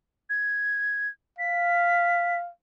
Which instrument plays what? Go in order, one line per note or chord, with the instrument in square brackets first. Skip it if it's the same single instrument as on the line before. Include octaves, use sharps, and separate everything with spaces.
[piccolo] G#6
[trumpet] F5 [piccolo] B6